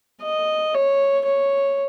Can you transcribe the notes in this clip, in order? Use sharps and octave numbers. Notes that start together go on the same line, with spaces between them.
D#5
C#5
C#5